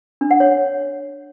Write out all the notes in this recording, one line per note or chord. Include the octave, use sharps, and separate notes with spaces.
D4
F#5
C#5